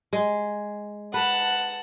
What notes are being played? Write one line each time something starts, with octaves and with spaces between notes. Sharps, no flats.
G#3
B4 F#5 A5